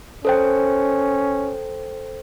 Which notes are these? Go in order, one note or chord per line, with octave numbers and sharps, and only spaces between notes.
C#4 A4 C5 G5